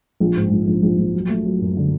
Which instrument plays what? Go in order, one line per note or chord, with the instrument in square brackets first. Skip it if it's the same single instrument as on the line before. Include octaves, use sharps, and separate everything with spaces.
[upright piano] A#1
G#2
A#1
A#1
A#1
A#1
F#3
A3
F#3
F#2
D3